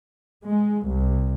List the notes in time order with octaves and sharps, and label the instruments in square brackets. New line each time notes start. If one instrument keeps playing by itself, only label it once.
[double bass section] G#3
C2